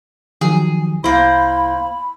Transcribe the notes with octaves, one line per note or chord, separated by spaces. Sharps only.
D#3 F3 F#3 G#4
C2 A#3 E4 C5 B5